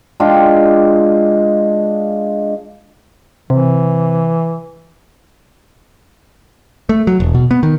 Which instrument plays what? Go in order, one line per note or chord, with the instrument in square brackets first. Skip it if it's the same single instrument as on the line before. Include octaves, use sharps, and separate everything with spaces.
[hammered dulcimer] G#3 D4 F4 G5
[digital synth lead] C3 [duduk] E3
[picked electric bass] A3
F#3
E1
B2
B3
D#3